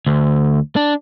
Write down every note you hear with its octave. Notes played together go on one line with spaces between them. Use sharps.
D2
D4